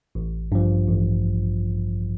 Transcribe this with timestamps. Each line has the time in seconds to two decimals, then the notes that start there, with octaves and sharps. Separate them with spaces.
0.15 A1
0.52 G2 F3
0.89 A1